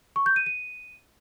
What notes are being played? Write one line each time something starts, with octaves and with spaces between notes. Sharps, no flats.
C#6
G6
D#7
D#7